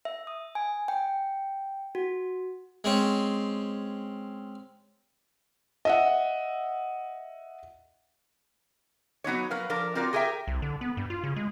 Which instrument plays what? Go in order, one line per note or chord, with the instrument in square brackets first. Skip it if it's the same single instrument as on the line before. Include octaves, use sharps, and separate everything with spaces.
[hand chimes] E5
D#6
G#5
G5
F#4
[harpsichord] G#3 C4 C#4
[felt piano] D#5 E5 F#5
[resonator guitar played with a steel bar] F#3 B3 D#4 C#5
F#3 A#4 B4 F5
F3 D4 A#4
C4 F4 F#4 A#4 D5
G4 G#4 A#4 C#5 E5 G5
[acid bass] C2
D3
B3
G2
F4
C#3
G#3